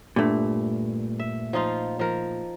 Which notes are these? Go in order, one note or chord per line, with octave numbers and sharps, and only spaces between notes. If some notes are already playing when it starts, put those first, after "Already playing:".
G2 A#2 A3
E5
F3 D#4 F4
F3 A#4